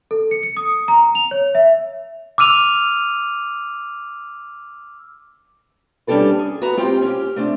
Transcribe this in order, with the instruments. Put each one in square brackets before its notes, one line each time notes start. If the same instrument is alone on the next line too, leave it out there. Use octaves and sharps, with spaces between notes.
[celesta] A4
C#7
C#7
D#6
A#5
F7
C#5
E5
[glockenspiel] D6 E6 F6 D#7 F7
[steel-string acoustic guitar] G3 C#4 D4 G4 A4 B4
G#4
F#4 G#4 B4 A#5
G#3 C4 F4 G4
C#4 G4
A3 C4 D4